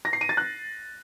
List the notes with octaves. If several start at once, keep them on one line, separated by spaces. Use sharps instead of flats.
A#6
C7
D#7
A6
F#6